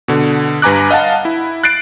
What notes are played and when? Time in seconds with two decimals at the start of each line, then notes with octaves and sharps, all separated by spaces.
0.08 B2 D3
0.62 G2 B4 G#5 A#5 D6 F#6
0.91 D#5 F5 F#5 A5
1.25 E4
1.64 F#6 A6 C7 D7